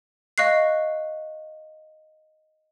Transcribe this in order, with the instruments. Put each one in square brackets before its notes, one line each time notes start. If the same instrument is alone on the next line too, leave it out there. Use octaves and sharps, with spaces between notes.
[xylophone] D#5 F5 C#6 F#6 C7